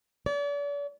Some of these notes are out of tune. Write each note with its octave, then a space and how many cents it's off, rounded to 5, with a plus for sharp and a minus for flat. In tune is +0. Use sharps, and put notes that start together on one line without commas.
D5 -40